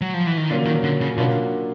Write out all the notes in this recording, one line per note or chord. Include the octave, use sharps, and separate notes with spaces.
F#3
F3
E3
D#3
A#2 D3 F#3 A#3 C#4
D#3
D3
C#3
B2 F#3 A#3 D4 F4